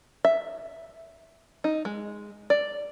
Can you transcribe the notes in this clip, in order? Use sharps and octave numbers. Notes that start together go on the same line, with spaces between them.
E5
D#4
G#3
D5